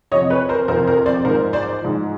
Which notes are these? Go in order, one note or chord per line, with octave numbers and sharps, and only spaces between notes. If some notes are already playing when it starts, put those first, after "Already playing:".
F2 C3 F3 C#5 D#5
B4 C#5
A#4 C5
F2 C3 F3 A#4 C5
A#4 C5
C5 D5
G#2 F3 A#4 C5
C5 D5
G#2 F3